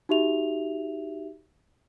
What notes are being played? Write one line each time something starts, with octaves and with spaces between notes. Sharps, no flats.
D#4 F#4 G4 E5 F7